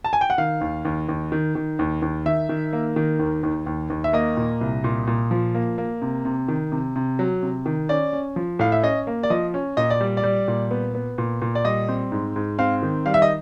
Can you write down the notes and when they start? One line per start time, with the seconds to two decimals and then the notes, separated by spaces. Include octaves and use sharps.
0.04 A5
0.13 G#5
0.21 G5
0.30 F#5
0.38 D#3 F5
0.61 D#2
0.85 D#2
1.09 D#2
1.32 D#3
1.55 D#3
1.79 D#2
2.02 D#2
2.26 D#3 E5
2.49 D#3
2.73 A#3
2.96 D#3
3.19 D#2
3.43 D#2
3.66 D#2
3.90 D#2
4.04 E5
4.13 A#3 D#5
4.37 A#2
4.61 C2
4.84 A#2
5.07 A#2
5.31 F3
5.55 A#3
5.78 A#3
6.02 C3
6.25 C3
6.48 D#3
6.72 C3
6.96 C3
7.19 F#3
7.43 C3
7.66 D#3
7.89 C#4 D5
8.13 C#4
8.36 F3
8.59 A2 F5
8.72 E5
8.83 C#4 D#5
9.07 A#3
9.23 D5
9.30 F3 D#5
9.54 C#4
9.77 A#2 D#5
9.90 D5
10.01 G3
10.17 D5
10.23 G3
10.48 A#2
10.71 B3
10.95 B3
11.18 A#2
11.42 A#2
11.55 D5
11.65 G3 D#5
11.89 C4
12.12 G#2
12.36 G#2
12.59 C4 F5
12.82 D#3
13.06 G3 F5
13.14 E5
13.22 D#5